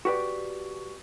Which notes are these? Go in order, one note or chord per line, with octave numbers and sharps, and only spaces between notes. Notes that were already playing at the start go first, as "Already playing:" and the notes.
F#4 G4 B4 D5